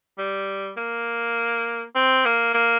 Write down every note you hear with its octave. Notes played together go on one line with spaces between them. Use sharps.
G3
A#3
C4
A#3
A#3